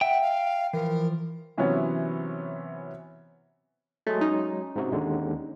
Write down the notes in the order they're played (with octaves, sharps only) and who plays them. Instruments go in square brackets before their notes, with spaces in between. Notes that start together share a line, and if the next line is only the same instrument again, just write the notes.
[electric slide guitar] E5 [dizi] F#5 [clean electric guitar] G5
[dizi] F5
[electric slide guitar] E3 F3 [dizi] A#4
[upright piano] C3 E3 F#3 B3 C#4
[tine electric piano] F#3 G#3 G#4 [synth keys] A3
[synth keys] C#4 D#4
[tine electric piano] G#2 C3 F#4
D#2 D3 G#3